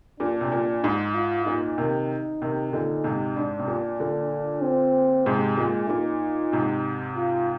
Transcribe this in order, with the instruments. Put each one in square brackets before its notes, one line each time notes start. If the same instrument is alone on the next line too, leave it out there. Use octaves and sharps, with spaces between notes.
[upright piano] A#2 [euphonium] D4
[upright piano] C3
A#2
[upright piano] G#2 [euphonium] D#4
[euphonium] F4
[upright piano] A#2 [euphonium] D#4
[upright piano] C3 D#3
C3 D#3
[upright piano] A#2 D3 [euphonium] D#4
[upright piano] G#2 C3
[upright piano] G#2 [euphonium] D4
[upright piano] C3
A#2
A#2 D3
[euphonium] C4
[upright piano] G#2 C3 [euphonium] G#3
[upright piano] A#2 [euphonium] G#3
[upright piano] A#2 [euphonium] D#4
[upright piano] G#2 C3
[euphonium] F4